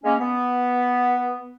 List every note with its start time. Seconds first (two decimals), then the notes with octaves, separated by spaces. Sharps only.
0.04 G#3 A#3 C#4
0.19 B3